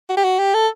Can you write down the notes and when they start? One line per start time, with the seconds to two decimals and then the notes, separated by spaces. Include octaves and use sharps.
0.09 F#4
0.17 G4
0.24 F#4
0.39 G4
0.54 A4